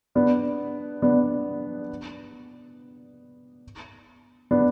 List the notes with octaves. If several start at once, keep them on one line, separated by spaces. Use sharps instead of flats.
B3 D4
B3 D4
B3 D4